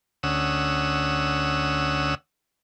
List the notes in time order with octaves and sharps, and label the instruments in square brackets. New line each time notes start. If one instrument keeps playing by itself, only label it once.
[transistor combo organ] D2 C#4 F#5 D#6 E6